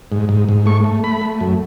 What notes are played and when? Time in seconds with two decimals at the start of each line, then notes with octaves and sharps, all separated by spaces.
0.12 G#2
0.29 G#2
0.49 G#2
0.66 A3 C#6
0.84 A3
1.04 A3 B5
1.22 A3
1.40 F#2